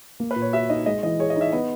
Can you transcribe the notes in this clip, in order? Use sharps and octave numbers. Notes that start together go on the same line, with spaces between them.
A#3
B4
A#2
C#5
F#4 E5
D#4 D#5
G#3 D#5
E3 D#5
G#4 C#5
D#5
D#4 E5
B3 D#5